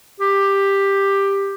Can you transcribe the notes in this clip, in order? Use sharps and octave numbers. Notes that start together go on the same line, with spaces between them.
G4